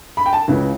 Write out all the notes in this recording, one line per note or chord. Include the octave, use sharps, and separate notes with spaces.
B5
G5
A5
C#2 C#3 E3